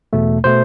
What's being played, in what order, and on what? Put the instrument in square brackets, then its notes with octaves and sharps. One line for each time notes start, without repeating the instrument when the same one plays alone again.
[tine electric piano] E2 B2 A3
B2 A3 C5